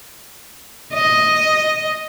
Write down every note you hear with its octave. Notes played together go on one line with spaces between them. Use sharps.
D#5